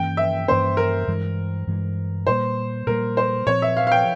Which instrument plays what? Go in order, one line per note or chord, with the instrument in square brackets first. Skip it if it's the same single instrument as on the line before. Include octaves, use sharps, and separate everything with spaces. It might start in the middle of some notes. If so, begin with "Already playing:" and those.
Already playing: [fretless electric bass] G2 E3 A#3 C#4 [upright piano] G5
[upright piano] E5
[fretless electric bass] G2 E3 A#3 C#4 [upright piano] C5
[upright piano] A#4
[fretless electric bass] G2 E3 G#3
G2 E3 G#3
[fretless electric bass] A#2 G3 A#3 [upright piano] C5
[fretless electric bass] A#2 G3 A#3 [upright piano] A#4
[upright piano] C5
[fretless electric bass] A#2 F3 C4 [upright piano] C#5
[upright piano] E5
F5
F5
G5